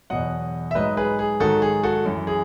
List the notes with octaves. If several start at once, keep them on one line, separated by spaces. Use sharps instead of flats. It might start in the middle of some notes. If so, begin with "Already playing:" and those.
E2 B2 F#3 D#5 F#5
E5
G#2 F#3 B4 D#5
G#4 B4
G#4
G#2 D#3 F#3 F#4 A4
G#4
F#4 A4
F#2 E3
G#4